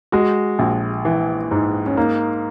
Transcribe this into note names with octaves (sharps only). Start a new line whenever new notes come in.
G#3 F#4
A#1
E3
G#2
C#4
A#3 D#4